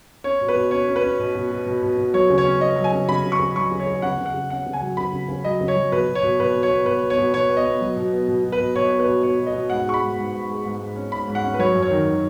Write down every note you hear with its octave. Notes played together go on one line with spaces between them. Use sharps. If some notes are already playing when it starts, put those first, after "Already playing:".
C#4 C#5
B2
B4
B2
C#4 C#5
C#4
B4
C#4
B2
B2
B2
B2
B2
B2
F#3 C#5
C#3
C#5
C#4
C#4 D#5
F#3
G#5
C#3
C#3 B5
C#3
C#6
C#3
F#3 C#6
C#3
C#5
C#3
C#3 F#5
C#3
F#5
C#3
C#4 F#5
C#3
G#5
F#3
C#3 B5
C#3
C#3
F#3 D#5
C#3
C#5
F#3
B2 B4
B2
C#5
B2
B2 B4
B2
C#5
B3
B2 B4
B3
C#5
B2
B2 C#5
B3
D#5
B3
F#3
B2
B3
B2
B2
B4
B2
B2 C#5
B3
B4
B2
B2 C#5
B2
D#5
B2
G#2 F#5
G#3 C#6
B5
G#2
G#2
G#2
G#3
G#2
G#2
C#4
G#2 B5
G#2
F#5
C#4
B4
F#3 C#5
F#2
C#5
D#3
D#3